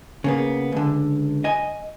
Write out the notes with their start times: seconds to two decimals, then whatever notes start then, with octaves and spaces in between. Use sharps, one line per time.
0.24 C#3 A#3 B3
0.72 C#2 D3
1.44 D#5 G#5